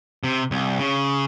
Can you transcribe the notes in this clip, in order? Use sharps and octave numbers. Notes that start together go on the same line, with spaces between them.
C3
C2
C#3